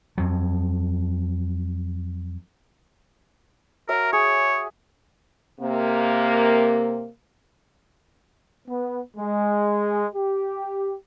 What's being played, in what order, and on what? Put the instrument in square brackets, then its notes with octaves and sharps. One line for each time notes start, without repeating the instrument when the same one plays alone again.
[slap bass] F2 F#3
[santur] F#4 C#5 E5 [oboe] A#4
[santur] G#4 [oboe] C#5
[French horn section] C3 A#3
[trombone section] B3
G#3
G4